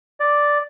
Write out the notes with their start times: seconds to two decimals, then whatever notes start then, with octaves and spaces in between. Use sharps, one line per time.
0.20 D5